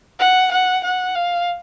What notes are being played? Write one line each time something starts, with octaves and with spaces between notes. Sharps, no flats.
F#5
F#5
F#5
F5